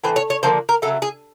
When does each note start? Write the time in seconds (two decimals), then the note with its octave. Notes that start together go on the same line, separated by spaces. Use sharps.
0.04 A2 E3 C5
0.16 C#5
0.30 C#5
0.43 D3 F3 A#3 C5
0.69 A#4
0.82 C#3 F#3 A3 A4
1.02 G#4